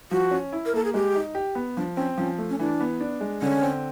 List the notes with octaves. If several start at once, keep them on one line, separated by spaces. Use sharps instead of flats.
F3 F#4
C#4
E4
A#4
A#3 A4
G#4
G#3 G4
D#4
G4
B3
F3 D4
C4 C#4
F3 C#4
A3
C#4
E3 D4
B3
D4
G#3
D3 C#4
C4